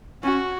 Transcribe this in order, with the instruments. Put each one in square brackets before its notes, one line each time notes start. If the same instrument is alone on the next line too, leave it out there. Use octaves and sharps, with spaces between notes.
[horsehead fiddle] C#4 [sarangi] F#4